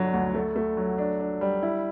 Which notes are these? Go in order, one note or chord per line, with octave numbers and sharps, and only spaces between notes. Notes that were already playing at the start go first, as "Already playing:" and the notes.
Already playing: G1 D3 F#3
D2
A3
A3
F#3
D4
D4
G3
E4